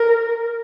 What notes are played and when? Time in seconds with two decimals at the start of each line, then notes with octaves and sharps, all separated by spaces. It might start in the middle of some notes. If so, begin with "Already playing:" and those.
Already playing: A#4